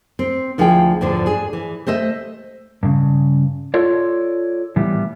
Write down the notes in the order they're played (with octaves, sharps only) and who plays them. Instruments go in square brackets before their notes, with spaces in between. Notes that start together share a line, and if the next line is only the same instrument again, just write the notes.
[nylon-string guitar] C4
D2 F3 E4 G#4 F5 G5
E2 G#2 D3 F3 D4
D4 G#4
E3
A3 C5 D#5 E5
[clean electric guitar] G2 C#3
F4 A4 C#5 D5
A2 E3 G3 B3